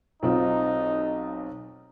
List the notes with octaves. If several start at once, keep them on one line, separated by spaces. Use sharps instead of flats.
B1 C4 D#4 F4